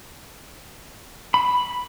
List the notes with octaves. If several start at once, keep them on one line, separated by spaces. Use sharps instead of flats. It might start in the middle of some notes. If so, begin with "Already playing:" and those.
B5